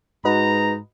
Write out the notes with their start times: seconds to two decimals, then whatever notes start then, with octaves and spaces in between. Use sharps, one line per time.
0.25 G#2 D#4 F#4 B4 D#5 A#5